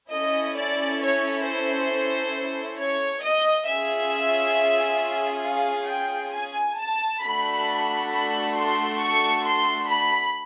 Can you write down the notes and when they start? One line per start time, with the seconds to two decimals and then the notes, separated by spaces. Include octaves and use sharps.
0.10 C#4 E4 A4 D#5
0.55 D5
1.00 C#5
1.44 C5
2.78 C#5
3.22 D#5
3.67 C#4 F4 G#4 E5
5.44 F5
5.90 G5
6.34 G#5
6.78 A5
7.23 A3 D4 F#4 A4 B5
8.12 B5
8.56 C6
9.01 C#6
9.46 C6
9.90 B5